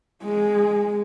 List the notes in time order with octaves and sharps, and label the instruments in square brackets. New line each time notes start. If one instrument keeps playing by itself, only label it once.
[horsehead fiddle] G#3